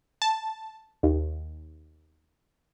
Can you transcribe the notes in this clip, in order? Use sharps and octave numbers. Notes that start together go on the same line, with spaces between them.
A5
D#2